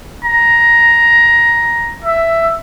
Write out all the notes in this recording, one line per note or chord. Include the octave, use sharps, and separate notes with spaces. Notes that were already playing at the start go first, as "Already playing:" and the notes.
A#5
E5